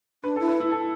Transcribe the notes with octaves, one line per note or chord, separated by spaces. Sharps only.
D4 B4
A4
E4
B4
E4
A4